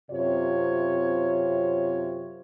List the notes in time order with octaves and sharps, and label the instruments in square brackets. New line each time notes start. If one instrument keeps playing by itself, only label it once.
[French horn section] F#2 C3 C4 F4 C#5